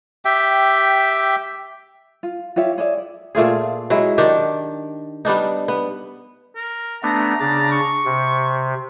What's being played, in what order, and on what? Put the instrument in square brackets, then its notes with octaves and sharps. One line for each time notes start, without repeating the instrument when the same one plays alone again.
[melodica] G4 E5 G5
[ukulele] F4
F4 G4 C#5 E5
G#4 C#5 D5 E5
D5
[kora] A#2 A3 F4 G#4
F#3 G#3 E4
D#3 D4 G4
G3 B3 D4 D#4
B3
[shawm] A#4
[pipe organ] A3 B3 D4 [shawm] A#5
[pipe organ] C#3 D4 A6
[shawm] C#6
[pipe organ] C3